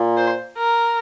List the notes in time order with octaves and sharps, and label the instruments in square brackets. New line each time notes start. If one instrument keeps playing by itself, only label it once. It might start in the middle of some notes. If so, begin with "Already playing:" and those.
Already playing: [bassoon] A#2
[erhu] C5
A#4